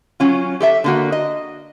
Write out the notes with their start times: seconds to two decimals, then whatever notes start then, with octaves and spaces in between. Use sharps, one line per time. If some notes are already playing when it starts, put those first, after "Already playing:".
0.20 F#3 C#4 F4
0.60 G4 A4 E5
0.84 D3 A#3 F#4
1.12 D#5